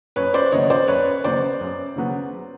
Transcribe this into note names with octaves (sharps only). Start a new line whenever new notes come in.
F#2 B4 C#5
C5 D5
C#3 F#3 B3 C#5 D#5
C5 D5
F#2 B4 C#5
C#3 F#3 B3 C5 D5
F#2
C#3 F#3 B3